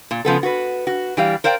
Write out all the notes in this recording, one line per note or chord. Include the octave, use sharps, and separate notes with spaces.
A#2
C#3 F3 B3 A4
F#4 B4
F#4
E3 G3 F5
A#4 C5 D5 F5 G5